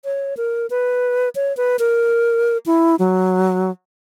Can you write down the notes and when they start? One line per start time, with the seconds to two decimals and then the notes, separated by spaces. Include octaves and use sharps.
0.05 C#5
0.37 A#4
0.70 B4
1.35 C#5
1.57 B4
1.79 A#4
2.66 E4
2.99 F#3